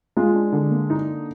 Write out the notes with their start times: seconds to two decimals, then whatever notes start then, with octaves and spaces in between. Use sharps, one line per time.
0.17 G#3 F4
0.35 D4
0.52 D3
0.71 A#3
0.90 D#4